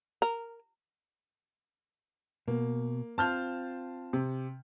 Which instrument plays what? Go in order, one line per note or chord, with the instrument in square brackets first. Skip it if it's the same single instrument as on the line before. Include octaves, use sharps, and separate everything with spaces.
[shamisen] A#4
[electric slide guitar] B2 [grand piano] A#3
[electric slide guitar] C4 F4 [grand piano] A5 F6 G6
[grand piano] C3